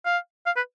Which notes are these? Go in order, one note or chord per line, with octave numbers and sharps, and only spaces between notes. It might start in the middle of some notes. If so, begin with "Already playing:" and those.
F5
F5
B4